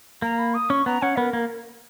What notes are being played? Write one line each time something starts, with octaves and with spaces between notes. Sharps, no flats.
A#3 A#5
B5
D#6
C#4 C#6
B3 A#5
C#4 F#5
B3 A#4
A#3